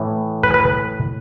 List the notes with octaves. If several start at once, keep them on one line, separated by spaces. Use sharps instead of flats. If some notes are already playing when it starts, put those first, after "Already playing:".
Already playing: A2 E3
B4
B4